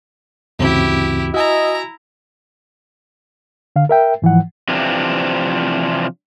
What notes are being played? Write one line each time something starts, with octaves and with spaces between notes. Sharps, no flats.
D2 G2 C#3 E3 C4 E4 F#4 G4
E4 F#4 D#5 G#5 A#5 E6
D3 F5
A#4 E5 G5
G#2 E3 F3 F#5
C3 E3 F3 C4 D4